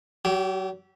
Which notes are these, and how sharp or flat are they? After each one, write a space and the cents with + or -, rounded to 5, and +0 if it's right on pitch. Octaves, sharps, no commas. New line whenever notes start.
F#3 +35 G4 -10